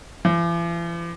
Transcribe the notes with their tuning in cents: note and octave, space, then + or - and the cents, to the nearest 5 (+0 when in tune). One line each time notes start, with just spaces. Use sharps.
E3 +45